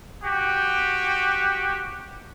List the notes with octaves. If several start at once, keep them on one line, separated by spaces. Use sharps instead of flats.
F#4 G4